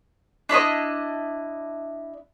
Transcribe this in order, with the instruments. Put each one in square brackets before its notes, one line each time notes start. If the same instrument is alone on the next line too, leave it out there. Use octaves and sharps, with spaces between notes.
[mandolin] D4 E4 C#5 D#5